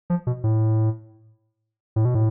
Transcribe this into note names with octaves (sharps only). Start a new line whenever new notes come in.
F3
B2
A2
A2
B2
A2